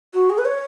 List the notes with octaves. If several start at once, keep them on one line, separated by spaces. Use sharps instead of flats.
F#4
G#4
B4
C#5